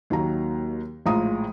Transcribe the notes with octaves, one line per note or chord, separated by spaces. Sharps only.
D#2 D#3 F#3 A#3 A#5
A#1 A2 G#3 F4 A#5 D#6